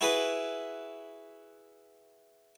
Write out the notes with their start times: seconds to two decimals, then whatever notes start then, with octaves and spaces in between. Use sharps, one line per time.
0.01 E4 F#4 G#4 B4